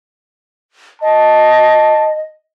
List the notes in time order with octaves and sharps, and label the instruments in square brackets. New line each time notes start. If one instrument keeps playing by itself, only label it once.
[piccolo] D#5 [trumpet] A5